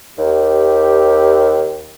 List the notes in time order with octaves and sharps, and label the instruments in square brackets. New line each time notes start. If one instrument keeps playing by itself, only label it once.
[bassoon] D#2 [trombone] G4